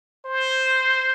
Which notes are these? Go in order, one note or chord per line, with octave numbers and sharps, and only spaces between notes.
C5